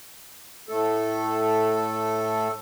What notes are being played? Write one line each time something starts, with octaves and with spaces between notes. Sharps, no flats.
A2 A3 A4